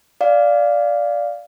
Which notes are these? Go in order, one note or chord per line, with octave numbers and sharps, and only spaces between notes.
D5 F5